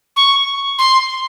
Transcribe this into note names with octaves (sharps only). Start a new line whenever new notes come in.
C#6
C6